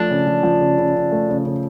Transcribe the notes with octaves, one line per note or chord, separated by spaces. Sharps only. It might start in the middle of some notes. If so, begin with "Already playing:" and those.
Already playing: F3 A3 D4
C#3
F3
F3
C#3
C#3
C#3
A3
C#3
C#3